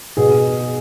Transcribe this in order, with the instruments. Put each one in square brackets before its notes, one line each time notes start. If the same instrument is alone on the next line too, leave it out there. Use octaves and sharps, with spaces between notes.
[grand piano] B2 G#4